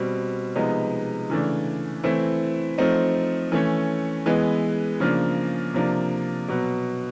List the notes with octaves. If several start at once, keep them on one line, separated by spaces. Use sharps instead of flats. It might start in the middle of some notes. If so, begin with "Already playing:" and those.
Already playing: B2 G3 C4
C3 F3 G#3 B3 D#4
C#3 E3 A3 D4
E3 A3 C4 E4
F3 A3 C4 D#4
E3 A3 C#4
E3 G#3 B3
C#3 F3 A#3 D4
C3 F3 A#3 D4
B2 F#3 B3